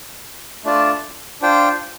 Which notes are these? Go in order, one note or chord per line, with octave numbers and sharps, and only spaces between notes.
A3 D4 F4 D5 A5
D4 F4 C5 G5